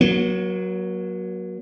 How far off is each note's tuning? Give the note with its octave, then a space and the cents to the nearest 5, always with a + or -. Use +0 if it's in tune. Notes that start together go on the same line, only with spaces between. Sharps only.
F#3 +0 A#3 +40